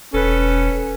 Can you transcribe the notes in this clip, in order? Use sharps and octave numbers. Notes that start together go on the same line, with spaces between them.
E1 C#4 A4 B4